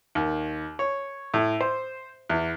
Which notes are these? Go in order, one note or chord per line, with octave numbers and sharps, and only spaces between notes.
D#2
C#5
A2
C5
E2